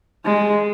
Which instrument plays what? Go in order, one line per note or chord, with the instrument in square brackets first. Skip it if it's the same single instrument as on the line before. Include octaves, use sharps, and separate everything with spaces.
[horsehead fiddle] G#3